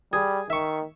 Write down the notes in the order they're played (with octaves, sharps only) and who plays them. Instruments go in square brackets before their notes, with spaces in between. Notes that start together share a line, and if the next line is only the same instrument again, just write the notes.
[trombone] G3 [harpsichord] G#4
[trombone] D#3 [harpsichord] E5 C#6